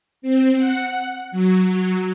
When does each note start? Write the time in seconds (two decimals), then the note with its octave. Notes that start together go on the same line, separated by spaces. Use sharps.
0.22 C4
0.57 F#5
1.32 F#3